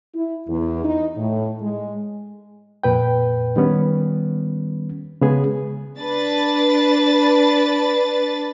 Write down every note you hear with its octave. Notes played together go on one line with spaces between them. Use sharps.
E4
E2
D#4
A2
G#3
F2 A#2 B4 G5
D#3 G3 B3 C#4
C#3 G#3 B3 G#4
D4 B4 A6